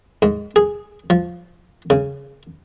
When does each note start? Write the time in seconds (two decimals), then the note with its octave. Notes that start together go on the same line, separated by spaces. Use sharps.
0.22 G#2
0.56 G#4
1.10 F3
1.90 C#3